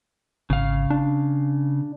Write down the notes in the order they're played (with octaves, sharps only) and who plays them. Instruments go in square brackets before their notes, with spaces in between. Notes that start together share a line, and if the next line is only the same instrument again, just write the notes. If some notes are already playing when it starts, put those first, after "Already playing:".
[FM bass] G#1 [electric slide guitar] C#3 F5
[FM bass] D4